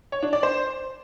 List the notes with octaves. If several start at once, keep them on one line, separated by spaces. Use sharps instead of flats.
C#5
D4
D5
C5